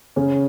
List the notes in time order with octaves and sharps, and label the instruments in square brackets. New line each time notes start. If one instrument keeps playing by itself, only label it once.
[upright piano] C#3 C#4